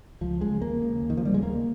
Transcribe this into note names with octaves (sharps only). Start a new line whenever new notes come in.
C#2 F3
C#3 G#3
D#2 A#3
C#3
D#2
D#3
F3
C#3 G3
G#3
D#2 A#3